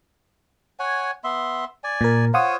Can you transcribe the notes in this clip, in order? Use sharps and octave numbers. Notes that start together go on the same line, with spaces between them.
C#5 F#5 G#5
B3 E5 C6
D5 G#5
A#2 A#4
F4 C5 C#5 F5 F#5 D#6